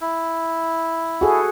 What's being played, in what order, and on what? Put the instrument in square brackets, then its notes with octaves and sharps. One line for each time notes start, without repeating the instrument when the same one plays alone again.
[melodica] E4
[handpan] F#4 G#4 A4